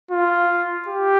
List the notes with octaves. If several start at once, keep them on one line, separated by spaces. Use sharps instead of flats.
F4
G4